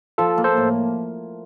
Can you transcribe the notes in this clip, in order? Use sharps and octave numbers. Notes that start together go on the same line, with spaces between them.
F3 F4 A4
A#3
A4 C5
A2